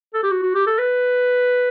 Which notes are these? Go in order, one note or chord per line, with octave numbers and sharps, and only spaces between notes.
A4
G4
F#4
F#4
G4
A4
B4